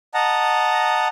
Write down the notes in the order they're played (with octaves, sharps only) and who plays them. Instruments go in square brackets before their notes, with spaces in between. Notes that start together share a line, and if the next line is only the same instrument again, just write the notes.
[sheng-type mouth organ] D#5 F#5 A5 A#5